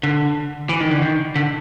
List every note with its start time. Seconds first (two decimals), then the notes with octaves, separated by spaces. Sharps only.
0.03 D3
0.69 E3
0.81 D#3
0.91 D3
1.02 D#3
1.36 D3